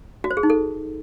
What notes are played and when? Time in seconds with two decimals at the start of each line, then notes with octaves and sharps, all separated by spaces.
0.24 F#4
0.31 C5
0.37 G#4
0.43 D#4
0.50 A4